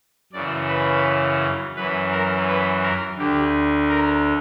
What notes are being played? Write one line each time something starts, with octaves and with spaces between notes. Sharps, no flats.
F#2 C#3 E3 D5
B4
F#2 E3 B4
A#4
B4
A#4
D2 D3 G4
A#4